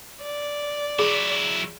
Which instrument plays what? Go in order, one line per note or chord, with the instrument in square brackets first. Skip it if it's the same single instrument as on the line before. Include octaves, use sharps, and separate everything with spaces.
[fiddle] D5
[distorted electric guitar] F#3 E4 [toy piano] G#4